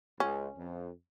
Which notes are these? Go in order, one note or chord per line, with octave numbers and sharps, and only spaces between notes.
C#2 C#4
F2